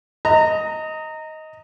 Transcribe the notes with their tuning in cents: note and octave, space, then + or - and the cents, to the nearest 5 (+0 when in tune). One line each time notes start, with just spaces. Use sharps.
D#5 +10 A#5 -20